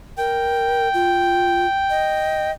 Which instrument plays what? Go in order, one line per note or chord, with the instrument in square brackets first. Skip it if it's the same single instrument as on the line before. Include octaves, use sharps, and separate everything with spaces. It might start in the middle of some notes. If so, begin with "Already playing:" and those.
[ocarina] A#4 [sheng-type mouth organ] G5
[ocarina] F4
D#5